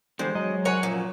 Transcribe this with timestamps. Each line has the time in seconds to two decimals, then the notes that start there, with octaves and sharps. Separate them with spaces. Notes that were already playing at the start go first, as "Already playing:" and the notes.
0.19 E2 D3 G3 G#3 C5
0.35 F#3 D#5
0.65 A#4 C5 C#5 F#5 G#5
0.83 F#2 A#2 F3